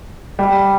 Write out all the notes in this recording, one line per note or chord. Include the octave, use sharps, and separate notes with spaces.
G3